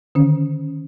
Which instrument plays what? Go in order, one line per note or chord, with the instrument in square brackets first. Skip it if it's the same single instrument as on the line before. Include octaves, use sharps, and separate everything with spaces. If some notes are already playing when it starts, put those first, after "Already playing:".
[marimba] D3 D#3 C#4